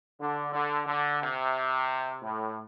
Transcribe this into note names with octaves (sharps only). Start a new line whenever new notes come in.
D3
D3
D3
C3
A2